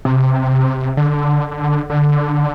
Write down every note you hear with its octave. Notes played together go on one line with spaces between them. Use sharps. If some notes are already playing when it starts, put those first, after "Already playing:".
C3
D3
D3